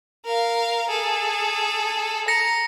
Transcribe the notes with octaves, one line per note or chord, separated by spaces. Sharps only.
A#4 F5
G#4 A4
A#5 A#6 C#7